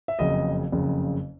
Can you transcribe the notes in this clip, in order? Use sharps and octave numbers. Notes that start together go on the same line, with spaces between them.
E5
F#1 F2 C#3 D#5
F#1 F2 C#3